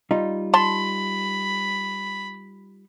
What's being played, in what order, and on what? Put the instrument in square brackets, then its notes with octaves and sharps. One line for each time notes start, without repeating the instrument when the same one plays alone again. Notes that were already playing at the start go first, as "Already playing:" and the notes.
[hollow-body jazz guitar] G3 D#4 F4
[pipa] A5 C6 [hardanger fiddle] B5